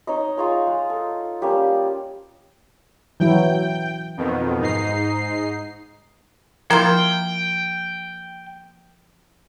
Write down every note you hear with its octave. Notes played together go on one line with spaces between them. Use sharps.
D#4 C#5 D#5
F4 G#4 C#5 A#5
G#3
A4
G3 A#3 C#4 G4
E3 F#3 E4 G5
F2 B2 D#3
G#2 D#4 C7
F3 A#3 E4 F4 G5